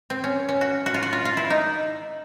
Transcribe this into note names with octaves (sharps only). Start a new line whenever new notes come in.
C4
C#4
C#4
F#4
F#4
F4
F#4
F4
F4
E4
D#4